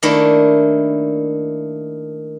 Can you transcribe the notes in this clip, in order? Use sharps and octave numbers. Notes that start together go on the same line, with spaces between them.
D#3 A3 A#3 D4 E4